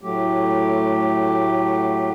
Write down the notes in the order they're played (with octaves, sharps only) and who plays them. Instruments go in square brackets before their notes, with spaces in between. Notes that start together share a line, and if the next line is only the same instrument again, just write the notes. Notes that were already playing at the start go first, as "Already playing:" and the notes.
[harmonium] A2 F#3 A3 G4